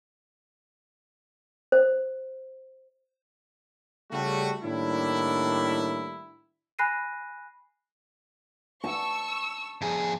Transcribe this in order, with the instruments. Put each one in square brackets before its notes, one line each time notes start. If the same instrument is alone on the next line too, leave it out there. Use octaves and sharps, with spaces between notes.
[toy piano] C5
[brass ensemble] C#3 G3 A3 F#4
A2 D#3 G3 A#3 D4 E4
[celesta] G#5 B5 F#6 A#6 C7 D#7
[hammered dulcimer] A5 [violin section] C#6 E6
[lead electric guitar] F2 G#4